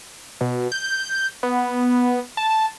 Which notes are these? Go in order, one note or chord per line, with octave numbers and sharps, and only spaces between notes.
B2
G6
B3
A5